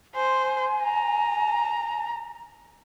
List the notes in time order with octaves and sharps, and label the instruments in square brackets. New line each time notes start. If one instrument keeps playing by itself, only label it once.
[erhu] C5 [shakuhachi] G#5
[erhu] A#5